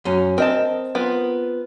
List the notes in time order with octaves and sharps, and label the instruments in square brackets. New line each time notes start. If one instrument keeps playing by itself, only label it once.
[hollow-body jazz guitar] F#2 C#4
[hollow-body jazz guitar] C4 [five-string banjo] A#4 D#5 A5
[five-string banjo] B3 F4 A#4